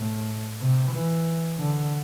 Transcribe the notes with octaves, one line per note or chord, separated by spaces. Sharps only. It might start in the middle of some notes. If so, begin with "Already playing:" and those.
Already playing: A2
C3
E3
D3